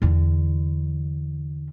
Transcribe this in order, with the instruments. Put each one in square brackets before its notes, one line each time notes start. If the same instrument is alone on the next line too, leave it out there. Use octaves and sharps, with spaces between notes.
[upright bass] E2 D3